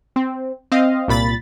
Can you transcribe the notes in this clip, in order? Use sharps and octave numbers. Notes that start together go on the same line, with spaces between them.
C4
C4 D#5 F5
C2 A#2 B5 A6